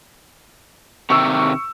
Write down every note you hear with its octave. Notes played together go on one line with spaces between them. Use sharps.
C3 D#3 C#6 E6